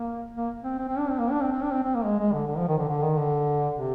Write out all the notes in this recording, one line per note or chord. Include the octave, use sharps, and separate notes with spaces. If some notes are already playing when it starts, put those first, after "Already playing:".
Already playing: A#3
A#3
C4
C4
C4
D4
C4
A#3
D4
C4
C4
D4
C4
C4
A#3
G#3
G#3
D3
D3
F3
D#3
D3
D3
D#3
D3
C3